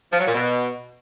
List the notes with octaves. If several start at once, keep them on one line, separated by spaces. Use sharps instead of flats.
F3
F#3
A#2
B2